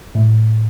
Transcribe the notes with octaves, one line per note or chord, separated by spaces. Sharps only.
A2 A3